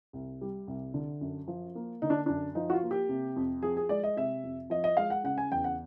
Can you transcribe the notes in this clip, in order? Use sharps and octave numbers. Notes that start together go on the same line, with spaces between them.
C2
G3
C2
D3
F#2
F3
A#3
D3 D#4
D4
F#2 D4
F3 D#4
F#4
F4
A#3
G4
C3
F2
F3 G#4
G#4
G#3 D5
D#5
C3 E5
F2
F3 D#5
D#5
G#3 F5
F#5
C#3 F#5
G#5
E2 G5
F#5